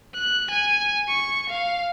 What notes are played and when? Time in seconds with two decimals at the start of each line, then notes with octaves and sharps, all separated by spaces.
0.14 F#6
0.51 G#5
1.08 C#6
1.50 F5